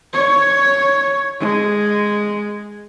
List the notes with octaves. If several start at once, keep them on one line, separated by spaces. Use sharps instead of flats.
C#5
G#3